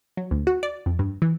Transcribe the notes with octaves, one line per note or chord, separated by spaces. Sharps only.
F#3
D2
F#4
D5
F2
G2
E3